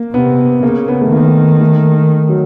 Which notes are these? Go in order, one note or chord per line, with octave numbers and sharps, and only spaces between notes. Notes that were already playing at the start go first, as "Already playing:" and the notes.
Already playing: A#3
C3 B3
C#3 A#3
B3
A3
D#3 A#3
A3
F#3